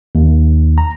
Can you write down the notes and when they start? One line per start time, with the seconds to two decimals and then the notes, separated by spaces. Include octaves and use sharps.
0.15 D#2
0.78 A#5